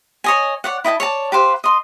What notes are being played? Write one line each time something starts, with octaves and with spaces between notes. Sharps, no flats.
C#5 D#5 G#5
C#5 D5 F#5
E4 D#5 G5 A5
C#5 D5 A5
G4 B4 C5 F5
D#5 C6